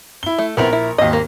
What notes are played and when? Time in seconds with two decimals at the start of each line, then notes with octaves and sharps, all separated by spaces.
0.23 E4 G7
0.39 A3
0.57 A#1 B3 C4 E4 A#4 F7
0.73 E4
0.98 G#1 D#2 D#5
1.13 A#3